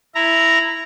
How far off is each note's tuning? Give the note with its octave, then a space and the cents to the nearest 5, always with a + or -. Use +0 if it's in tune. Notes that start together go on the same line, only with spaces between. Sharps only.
E4 +5 A#5 -5